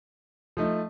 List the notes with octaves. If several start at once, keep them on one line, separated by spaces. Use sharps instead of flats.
F3 A3 D#4